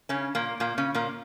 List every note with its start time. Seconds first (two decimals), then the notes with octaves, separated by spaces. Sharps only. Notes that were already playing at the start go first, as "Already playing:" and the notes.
0.09 C#3 C#4
0.35 A#2 A#3
0.60 A#2 A#3
0.78 C#3 C#4
0.94 A#2 A#3